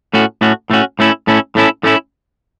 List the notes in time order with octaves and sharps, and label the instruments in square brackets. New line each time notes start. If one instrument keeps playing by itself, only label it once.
[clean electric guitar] A2 A3 C#4 F#4
A2 A3 C#4 F#4
A2 A3 C#4 F#4
A2 A3 C#4 E4
A2 A3 C#4 E4
A2 A3 C#4 E4
A2 A3 C#4 E4